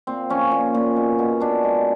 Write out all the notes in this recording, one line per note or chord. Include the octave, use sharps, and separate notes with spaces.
A#2 C4
F3 C#4
A#2
A#2
B2
B2
B2 D4
G#3